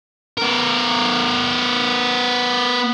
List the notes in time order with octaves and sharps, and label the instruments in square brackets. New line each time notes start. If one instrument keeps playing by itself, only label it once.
[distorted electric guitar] B3 A#4